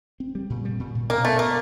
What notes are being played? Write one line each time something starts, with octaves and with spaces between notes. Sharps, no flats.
C4
G3
A#2
G3
A#2
A#2
B2 A#3
A3 B3
B2 A#3